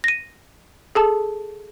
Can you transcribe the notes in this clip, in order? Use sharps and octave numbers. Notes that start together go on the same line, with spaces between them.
A#6 D#7
G#4 A4 A5